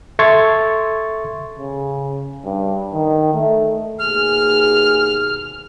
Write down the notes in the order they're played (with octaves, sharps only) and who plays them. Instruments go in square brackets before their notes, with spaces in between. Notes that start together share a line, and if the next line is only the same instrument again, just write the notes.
[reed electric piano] A4 E5 C6 C#6 G#6 A6
[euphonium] C#3
G2
D#3
A3
[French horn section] D#2 B2 G#4 [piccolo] F6